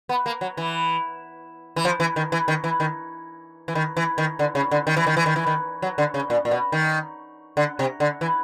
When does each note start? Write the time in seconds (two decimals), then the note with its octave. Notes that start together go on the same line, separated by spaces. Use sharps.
0.09 B3
0.26 A#3
0.41 F#3
0.57 E3
1.76 E3
1.85 F3
2.00 E3
2.16 D#3
2.32 E3
2.48 D#3
2.64 E3
2.80 D#3
3.68 E3
3.75 D#3
3.97 E3
4.18 D#3
4.39 D3
4.55 C#3
4.71 D3
4.87 D#3
4.96 E3
5.07 D#3
5.17 E3
5.26 D#3
5.36 E3
5.47 D#3
5.82 F#3
5.98 D3
6.14 C#3
6.30 A#2
6.45 A#2
6.51 B2
6.72 D#3
7.57 D3
7.79 C3
8.00 D3
8.21 E3